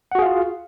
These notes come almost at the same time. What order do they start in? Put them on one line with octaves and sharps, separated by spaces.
F#5 F#4 G#4 F5 F4